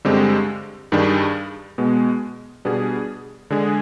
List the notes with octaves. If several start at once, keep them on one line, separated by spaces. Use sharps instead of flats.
G2 D3 G#3 C4 G4
G2 D#3 G3 D4 G#4
B2 G#3 B3
B2 G3 B3 D4 G#4
D3 G#3 D4 G#4